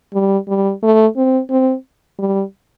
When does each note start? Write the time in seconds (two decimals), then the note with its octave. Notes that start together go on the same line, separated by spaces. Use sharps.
0.13 G3
0.48 G3
0.83 A3
1.16 C4
1.50 C4
2.19 G3